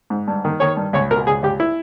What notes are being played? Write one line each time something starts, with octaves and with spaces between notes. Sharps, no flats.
G#2
G2
D#3
D#3 C#5
G2
C#2 C#5
B2 A#4
C#2 G#4
C#2 G4
E4